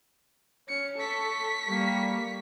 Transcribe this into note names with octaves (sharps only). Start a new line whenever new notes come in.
C#4 C#7
A4 C#6 B6
G3 A#3